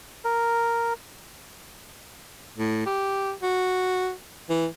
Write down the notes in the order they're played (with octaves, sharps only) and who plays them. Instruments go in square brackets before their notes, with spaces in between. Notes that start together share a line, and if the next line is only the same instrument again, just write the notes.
[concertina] A#4
[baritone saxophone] A2
G4
F#4
E3